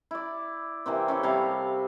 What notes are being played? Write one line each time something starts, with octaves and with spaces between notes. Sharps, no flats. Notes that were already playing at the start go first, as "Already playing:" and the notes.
E4 D5
C3 E3 A#3 C4
C#4 E4 A4
C3 G3 F5